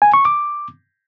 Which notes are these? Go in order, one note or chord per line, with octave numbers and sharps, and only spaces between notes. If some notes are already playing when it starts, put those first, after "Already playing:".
G#5
C#6
D6